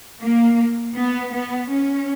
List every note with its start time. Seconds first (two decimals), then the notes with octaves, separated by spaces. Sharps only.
0.21 A#3
0.95 B3
1.33 B3
1.70 C#4